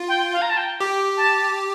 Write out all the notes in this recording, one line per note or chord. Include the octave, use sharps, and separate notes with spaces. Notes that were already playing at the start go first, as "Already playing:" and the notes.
Already playing: F4
G5
F5
A#5
A5
G5
G4 G5
A5